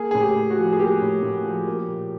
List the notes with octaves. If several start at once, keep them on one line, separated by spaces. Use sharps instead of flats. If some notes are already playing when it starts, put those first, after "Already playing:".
Already playing: A#3 G#4
A2 G#4
G4
A2
F#4
F3
G#4
A#3 G4
A2
A2
F3
A#3
A#2